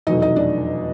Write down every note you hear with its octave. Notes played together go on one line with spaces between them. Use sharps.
F1 E2 B2 F#3 A3 D#4 D#5
D#4 D#5
D4 D5